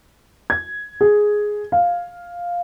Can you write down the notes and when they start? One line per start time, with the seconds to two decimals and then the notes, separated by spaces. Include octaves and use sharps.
0.50 G#6
1.01 G#4
1.72 F5